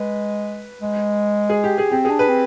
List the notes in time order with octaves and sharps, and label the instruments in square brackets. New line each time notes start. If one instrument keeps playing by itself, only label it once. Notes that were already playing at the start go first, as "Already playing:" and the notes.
Already playing: [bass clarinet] G#3 [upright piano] B4
[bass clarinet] G#3
[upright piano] G#4
G4
G#4
[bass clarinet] C4 [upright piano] G4
[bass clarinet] D4 [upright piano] G#4
[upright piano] B4
[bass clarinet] C4